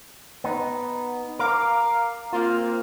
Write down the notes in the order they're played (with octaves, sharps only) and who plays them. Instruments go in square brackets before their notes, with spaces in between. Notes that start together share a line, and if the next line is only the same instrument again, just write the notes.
[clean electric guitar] B3 D#4
[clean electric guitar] A#4 [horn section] F5 [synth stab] D6
[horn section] A#3 C4 [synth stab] F4